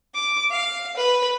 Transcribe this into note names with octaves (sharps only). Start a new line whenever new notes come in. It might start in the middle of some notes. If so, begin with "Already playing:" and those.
D6
F5
B4